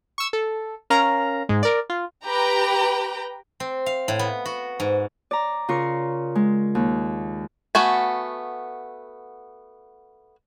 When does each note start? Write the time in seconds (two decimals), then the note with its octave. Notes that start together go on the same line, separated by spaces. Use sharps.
0.18 C#6 E6
0.33 A4
0.90 C#4 A#4 F5 A#5
1.49 G#2 G#3
1.63 A#4 D5
1.90 F4
2.25 G4 B4 G5 A#5
3.60 C4
3.86 F5
4.08 A2
4.19 B3
4.46 F#4
4.80 G#2
5.31 D5 A#5
5.68 C#3 F4 A#4 C#6
6.35 G#3
6.75 D#2
7.75 A3 B3 F#4 G#5